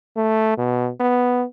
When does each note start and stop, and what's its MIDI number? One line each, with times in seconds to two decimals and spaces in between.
0.17 0.58 57
0.58 0.90 47
1.00 1.45 59